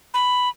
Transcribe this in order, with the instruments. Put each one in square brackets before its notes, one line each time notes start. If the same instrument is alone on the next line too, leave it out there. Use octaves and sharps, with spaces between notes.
[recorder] B5